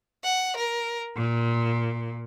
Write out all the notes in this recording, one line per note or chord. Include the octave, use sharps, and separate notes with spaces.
F#5
A#4
A#2